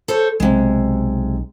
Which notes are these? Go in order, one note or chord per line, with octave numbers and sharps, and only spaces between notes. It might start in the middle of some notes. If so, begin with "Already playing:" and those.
A4 C5 C#5
B1 C3 G#3